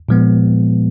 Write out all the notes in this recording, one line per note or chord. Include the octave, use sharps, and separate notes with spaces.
A#2 F3 G#3 B3